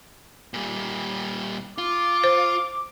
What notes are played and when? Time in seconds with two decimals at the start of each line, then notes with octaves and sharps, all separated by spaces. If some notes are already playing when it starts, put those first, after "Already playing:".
0.54 A#2 G3
1.78 F4 D6
2.24 C5